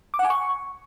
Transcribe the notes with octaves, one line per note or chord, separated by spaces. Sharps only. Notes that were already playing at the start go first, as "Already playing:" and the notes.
D6
F#5
G#5
C#6